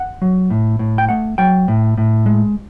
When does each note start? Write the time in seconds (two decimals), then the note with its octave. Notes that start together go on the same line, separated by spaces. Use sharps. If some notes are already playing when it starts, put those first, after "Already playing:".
Already playing: F#5
0.22 F#3
0.50 A2
0.79 A2
0.98 G5
1.09 A3 F#5
1.38 F#3 G5
1.68 A2
1.97 A2
2.26 G#3